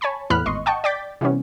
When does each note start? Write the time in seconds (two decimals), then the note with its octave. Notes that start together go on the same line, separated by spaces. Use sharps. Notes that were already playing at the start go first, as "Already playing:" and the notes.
0.01 C#5 G#5 A5 B5 C#6
0.30 E2 A2 B3 B5 F6 F#6
0.46 G#1 D#5 C6 C#6
0.66 D#5 F#5 G5 A5 C#6
0.84 D5 G5 D6 G6 A6 B6
1.21 C3 E3 G3 B3 C#4